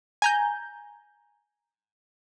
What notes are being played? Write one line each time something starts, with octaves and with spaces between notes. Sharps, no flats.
G#5 A#5 G6